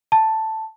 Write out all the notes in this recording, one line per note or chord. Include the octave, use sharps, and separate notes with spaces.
A5